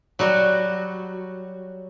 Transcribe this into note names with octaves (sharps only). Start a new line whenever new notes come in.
F#3 G3 F#4